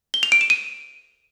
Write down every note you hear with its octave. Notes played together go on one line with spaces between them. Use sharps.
G7
F7
D7
E7
D#7